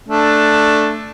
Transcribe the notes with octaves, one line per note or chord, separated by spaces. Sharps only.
A3 D4